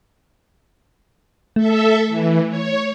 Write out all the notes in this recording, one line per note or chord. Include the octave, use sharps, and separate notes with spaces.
A3 A4 E5
E3
C#5